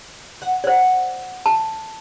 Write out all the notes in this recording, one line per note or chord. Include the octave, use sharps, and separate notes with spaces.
F#5
C5 D5 F#5
A5